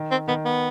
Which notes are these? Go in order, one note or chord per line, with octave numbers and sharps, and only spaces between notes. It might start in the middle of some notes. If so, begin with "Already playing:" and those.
Already playing: D#3
C4
D#3 B3
B3